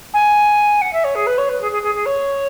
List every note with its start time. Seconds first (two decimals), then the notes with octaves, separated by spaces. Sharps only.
0.13 G#5
0.81 F#5
0.93 E5
1.04 C#5
1.15 G#4
1.26 B4
1.38 C#5
1.49 B4
1.61 G#4
1.71 G#4
1.82 G#4
1.95 G#4
2.05 C#5